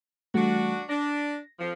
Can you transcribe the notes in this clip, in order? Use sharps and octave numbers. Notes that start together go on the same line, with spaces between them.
E3 G3 A3 D4 F#4
D4 A#6
F2 F3